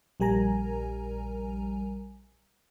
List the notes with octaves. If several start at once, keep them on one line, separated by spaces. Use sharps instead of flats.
A#1 G3 A#4 G#5 A#5